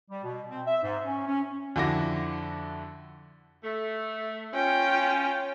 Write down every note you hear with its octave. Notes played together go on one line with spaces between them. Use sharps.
G3
B2
C4
E5
G#2
C#4
C#4
F2 D3 E4 F#4 D6 A#6
A3
C#4 F4 G5